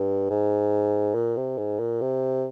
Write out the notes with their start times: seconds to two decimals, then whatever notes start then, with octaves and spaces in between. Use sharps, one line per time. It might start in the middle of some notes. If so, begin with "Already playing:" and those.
Already playing: G2
0.30 G#2
1.15 A#2
1.37 C3
1.58 G#2
1.80 A#2
2.01 C3